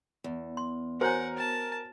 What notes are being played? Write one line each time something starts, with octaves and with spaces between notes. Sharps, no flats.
E2
C6
F#4 A#4 C5 C#5 F#5 G#5
A5